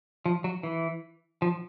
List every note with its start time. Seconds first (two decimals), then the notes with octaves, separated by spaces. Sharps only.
0.26 F3
0.44 F#3
0.63 E3
1.42 F3